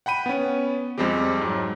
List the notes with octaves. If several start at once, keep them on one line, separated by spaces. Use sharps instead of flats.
F#5 G5 B5 D#7
B3 C#4
F2 G3 G#3 C4 G4
G#2 F#3